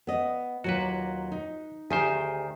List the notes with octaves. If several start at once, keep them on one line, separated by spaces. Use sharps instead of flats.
B3 D#5
D#2 A#2 F#3 F#4 B4
D#4
D2 D#3 G4 G#4 C5